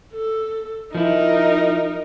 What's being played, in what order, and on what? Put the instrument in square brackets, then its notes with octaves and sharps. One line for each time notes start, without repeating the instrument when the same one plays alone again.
[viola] A4
[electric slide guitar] F3 E4 [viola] D#4 A#4